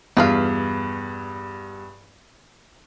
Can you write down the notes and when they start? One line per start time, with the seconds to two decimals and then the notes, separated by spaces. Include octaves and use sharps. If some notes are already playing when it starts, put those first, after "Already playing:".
0.17 E2 G2 F4 B4 F5